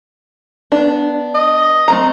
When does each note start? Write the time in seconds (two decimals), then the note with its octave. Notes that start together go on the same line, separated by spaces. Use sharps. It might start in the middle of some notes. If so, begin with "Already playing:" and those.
0.72 B3 D4
1.35 D#5
1.88 A3 C4 A#5